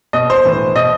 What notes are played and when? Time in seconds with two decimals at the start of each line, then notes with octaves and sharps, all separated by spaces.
0.13 B2 D#5
0.30 C5
0.45 A2 E3
0.75 B2 D#5